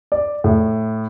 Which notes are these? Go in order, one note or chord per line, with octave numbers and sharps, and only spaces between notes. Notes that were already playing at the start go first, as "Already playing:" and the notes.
D5
A2